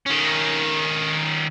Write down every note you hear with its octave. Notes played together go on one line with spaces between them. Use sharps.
D#3 C#4